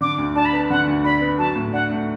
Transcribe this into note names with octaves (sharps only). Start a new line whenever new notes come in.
D3 D6
D2
D4 A5
B5
B3 A5
D3 F#5
D2
D4 B5
B3
F#3 A5
A2
D4 F#5
A3